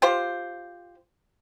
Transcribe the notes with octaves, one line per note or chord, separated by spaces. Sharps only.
F4 G4 C5